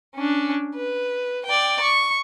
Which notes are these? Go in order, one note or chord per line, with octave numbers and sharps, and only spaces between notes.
C#4 D4
B4
D5 G5
C#6